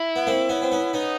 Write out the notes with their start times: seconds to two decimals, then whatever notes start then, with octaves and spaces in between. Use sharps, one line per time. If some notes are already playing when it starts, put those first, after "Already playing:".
Already playing: E4
0.16 B3
0.27 A#3 C4
0.49 B3 C#4
0.62 C4
0.71 B3 C#4
0.93 B3 C#4 D#4